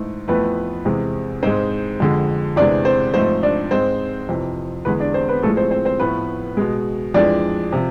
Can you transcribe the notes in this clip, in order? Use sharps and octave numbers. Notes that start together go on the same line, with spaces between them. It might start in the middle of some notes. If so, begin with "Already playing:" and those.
Already playing: G#2 E3 A3
F2 E3 A3 B3 B4
E2 C3 G#3
G#2 G#3 C4 C5
F2 D3 G#3
E2 C3 E3 G#3 D4 D5
C4 C5
G#2 F3 A3 C4 C5
D4 D5
G#2 G#3 C4 C5
F2 C3 E3
E2 D3 G#3 B3 B4
D4 D5
C4 C5
B3 B4
A2 F3 G#3 A3 A4
C4 C5
C4 C5
C4 C5
A2 F3 A3 B3 B4
B2 G#3
F2 E3 G#3 D4 D5
C3 F3